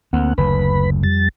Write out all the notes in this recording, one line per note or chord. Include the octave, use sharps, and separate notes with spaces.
D2 A#3 C4 F#5
F#1 D2 B4 B5
F2 G3 A6